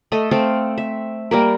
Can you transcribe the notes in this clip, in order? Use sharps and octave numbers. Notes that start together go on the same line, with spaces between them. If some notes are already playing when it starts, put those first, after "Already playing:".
A3 A4 D#5
A3 C4 A4 F5
E5
G3 A#3 A#4